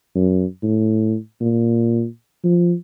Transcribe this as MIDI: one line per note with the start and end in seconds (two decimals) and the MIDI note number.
0.15 0.45 42
0.63 1.16 45
1.41 2.05 46
2.44 2.74 53